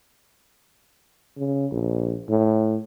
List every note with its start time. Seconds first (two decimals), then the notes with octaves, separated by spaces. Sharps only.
1.37 C#3
1.71 A#1
2.29 A2